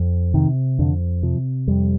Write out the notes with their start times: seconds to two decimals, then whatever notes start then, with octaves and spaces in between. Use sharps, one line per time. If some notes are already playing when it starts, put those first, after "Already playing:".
Already playing: F2
0.34 C3 D#3
0.79 F2 D3
1.23 C3 F3
1.68 F2 G3